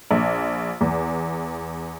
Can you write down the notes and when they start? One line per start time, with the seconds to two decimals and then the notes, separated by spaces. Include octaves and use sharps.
0.11 A#1
0.81 E2